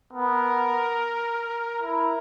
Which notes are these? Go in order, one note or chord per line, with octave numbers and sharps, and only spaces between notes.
B3 A#4
E4 A#4